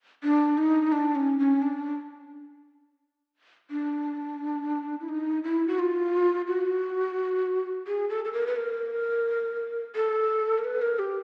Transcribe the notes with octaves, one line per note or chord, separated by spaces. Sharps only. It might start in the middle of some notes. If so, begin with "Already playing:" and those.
D4
D#4
D4
C#4
C#4
D4
D4
E4
D#4
E4
F#4
F4
F#4
G#4
A4
A4
A#4
B4
A#4
A4
A#4
B4
A#4
G4